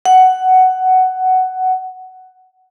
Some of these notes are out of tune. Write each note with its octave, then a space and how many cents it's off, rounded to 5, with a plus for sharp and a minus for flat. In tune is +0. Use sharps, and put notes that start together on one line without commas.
F#5 +10